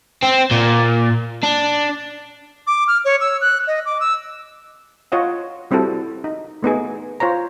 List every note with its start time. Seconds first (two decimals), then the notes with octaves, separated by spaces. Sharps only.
0.23 C4
0.51 A#2
1.43 D4
2.67 D6
2.88 F6
3.05 C#5
3.21 E6
3.41 F#6
3.67 D#5
3.85 D6
4.00 E6
5.12 F4 C#5 D#5 F#5
5.71 G3 C4 E4 F#4 A4
6.24 D#4
6.63 A3 B3 D#4 G#4
7.20 F4 C5 C#5 A#5